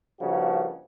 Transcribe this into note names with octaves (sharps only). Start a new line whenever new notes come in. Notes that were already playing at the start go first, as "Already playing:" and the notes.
G2 C#3 F3 A#3 D#4 F#4